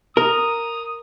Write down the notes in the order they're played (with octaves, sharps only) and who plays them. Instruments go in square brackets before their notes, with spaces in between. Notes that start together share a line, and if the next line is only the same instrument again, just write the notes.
[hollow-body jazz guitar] A#4 [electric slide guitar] A#5 [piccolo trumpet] D#6